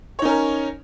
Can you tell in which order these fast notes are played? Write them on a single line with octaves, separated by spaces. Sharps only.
C#5 D#4 C#4 A#4